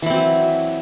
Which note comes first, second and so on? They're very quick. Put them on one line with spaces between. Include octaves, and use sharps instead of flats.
E3 E4 C4 F#3